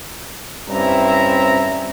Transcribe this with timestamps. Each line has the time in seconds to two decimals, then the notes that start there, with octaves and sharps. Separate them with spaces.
0.69 G2 C4 C#4 E4 E5 A#5